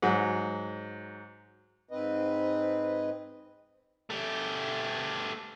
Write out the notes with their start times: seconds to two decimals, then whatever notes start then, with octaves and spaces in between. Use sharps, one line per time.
0.02 G#2 F#3
1.91 G#2 C4 B4 D#5
4.10 A3 G4